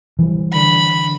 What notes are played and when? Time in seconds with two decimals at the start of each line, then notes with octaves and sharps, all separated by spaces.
0.19 E3 G3
0.53 D3 B5